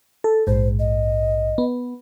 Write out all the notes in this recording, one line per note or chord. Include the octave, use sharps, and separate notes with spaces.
A4
A#1 G#2 C5
D#5
B3